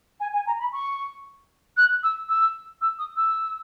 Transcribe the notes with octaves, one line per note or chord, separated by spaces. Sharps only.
G#5
G#5
A#5
B5
C#6
F#6
E6
E6
E6
D#6
E6